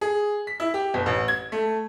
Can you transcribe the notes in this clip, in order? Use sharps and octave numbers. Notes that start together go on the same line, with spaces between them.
G#4
B6
E4
G4
G1
A1
G#6
A3